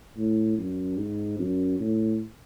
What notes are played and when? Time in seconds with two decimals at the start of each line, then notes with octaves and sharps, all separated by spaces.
0.17 A2
0.58 F#2
0.98 G#2
1.39 F#2
1.80 A2